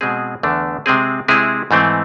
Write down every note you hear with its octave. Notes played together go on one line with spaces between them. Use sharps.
B2 G#3 C4 G#4
E2 D3 A3 D4
C3 G#3 C4 G#4
C3 G#3 C4 E4 G#4
G#2 E3 A3 C4